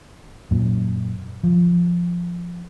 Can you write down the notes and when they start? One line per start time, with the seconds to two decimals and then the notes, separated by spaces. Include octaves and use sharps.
0.51 F#2 A#2
1.43 F3